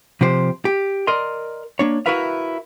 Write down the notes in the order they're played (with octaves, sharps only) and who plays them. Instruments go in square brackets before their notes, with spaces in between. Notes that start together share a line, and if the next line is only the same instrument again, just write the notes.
[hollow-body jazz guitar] C3 F3 G4 C5
G4
A#4 D5 D#5 C6
A#3 D4 C#5
E4 F#4 A#4 B4 E5 F5